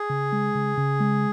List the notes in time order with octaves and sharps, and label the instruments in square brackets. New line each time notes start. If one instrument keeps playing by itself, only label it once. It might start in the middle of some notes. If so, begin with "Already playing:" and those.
Already playing: [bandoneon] G#4
[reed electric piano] C#3
G#3
C#3
C#3
G#3